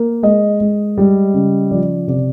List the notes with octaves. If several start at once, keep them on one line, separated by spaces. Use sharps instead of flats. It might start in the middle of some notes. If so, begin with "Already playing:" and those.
Already playing: A#3
G#3 D#5
G#3
G3
C#3
F3 D5
C3 D5